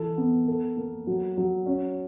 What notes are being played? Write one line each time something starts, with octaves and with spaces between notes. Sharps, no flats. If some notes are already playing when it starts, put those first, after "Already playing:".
Already playing: E3 A4
B3
A4
A#3
F#3
F#3
C#4